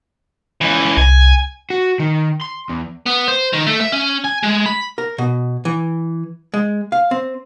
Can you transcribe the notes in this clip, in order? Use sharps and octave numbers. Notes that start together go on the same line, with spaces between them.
C#2 E3
C2 G#5
F#4
D#3
C6
E2
B3
C5
D#3
A3
E5
C#4
G#5
G#3
B5
A#4
B2
E3
G#3
F5
C4